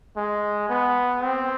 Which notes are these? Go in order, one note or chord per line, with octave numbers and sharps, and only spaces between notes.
G#3
B3
C4